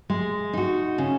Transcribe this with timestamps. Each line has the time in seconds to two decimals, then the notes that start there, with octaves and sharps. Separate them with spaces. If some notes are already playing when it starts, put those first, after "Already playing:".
0.10 G#3
0.53 D#4 F#4
0.98 C#3